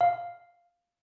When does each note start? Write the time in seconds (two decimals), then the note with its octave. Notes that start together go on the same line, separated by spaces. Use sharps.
0.01 F5